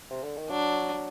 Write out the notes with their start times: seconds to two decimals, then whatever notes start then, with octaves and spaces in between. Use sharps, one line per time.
0.10 C3
0.23 D3
0.37 D#3
0.50 F#3 D4
0.94 F#3